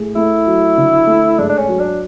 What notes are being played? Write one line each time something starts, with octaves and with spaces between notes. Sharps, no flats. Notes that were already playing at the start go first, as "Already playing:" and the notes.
Already playing: A2 G#4
A3 E4
F#3
D3
A3
G#2 D4
D4
C#4
F#3
D4